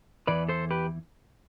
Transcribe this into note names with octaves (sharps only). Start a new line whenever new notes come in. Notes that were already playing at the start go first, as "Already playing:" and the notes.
E2 C3 E3 B4 D5
A4 C5
G4 B4